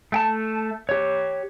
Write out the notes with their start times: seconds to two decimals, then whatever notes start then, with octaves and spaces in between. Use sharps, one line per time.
0.12 A3 G5 A5
0.89 G4 C#5